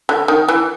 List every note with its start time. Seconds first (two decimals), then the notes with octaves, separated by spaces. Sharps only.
0.09 D3
0.28 D#3
0.48 E3